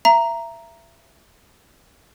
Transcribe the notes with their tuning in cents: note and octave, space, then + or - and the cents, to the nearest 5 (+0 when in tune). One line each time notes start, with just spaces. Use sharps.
E5 +25 A#5 +0